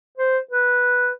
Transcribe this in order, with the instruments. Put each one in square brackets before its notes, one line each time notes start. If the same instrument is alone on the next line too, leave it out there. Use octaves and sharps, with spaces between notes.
[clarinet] C5
B4